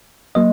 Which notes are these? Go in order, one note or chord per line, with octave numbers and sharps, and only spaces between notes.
F#3 A#3 D#5